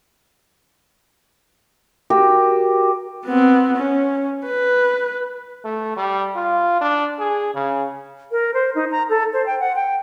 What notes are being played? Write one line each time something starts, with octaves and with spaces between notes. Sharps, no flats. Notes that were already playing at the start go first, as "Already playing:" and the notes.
F#4 G4 A#4
B3 C4
C#4
B4
A3
G3
F4
D4
G#4
C#3
A#4
C5
D#4
A#5
A4
C5
G5
F#5
G5